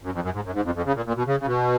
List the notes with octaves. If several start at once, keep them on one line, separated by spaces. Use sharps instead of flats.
F#2
F2
F#2
G#2
F#2
G#2
F2
F2
C#3
A#2
A#2
B2
C#3
C#3
B2